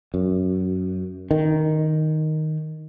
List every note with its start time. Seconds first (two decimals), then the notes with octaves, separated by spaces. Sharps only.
0.14 F#2
1.31 D#3